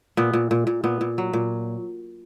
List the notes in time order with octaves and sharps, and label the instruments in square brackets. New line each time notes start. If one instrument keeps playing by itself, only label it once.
[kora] A#2 B3
A#2
A#2
A#2
A#2 B3
A#2
F#3
A#2